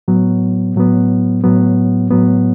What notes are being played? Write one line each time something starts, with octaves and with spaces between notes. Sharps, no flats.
A2 F#3 B3
A2 F#3 B3
A2 F#3 B3
A2 F#3 B3